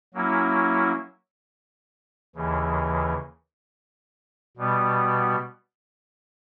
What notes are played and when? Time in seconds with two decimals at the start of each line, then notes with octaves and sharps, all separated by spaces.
0.14 F#3 A#3 C#4 E4
2.36 D#2 C#3 E3
4.57 B2 G3 B3